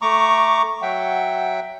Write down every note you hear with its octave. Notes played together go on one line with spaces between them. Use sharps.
A3 A#5 C#6 D6
F#3 E5 F#5 G5